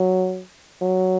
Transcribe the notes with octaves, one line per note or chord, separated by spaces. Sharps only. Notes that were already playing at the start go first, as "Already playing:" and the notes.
Already playing: F#3
F#3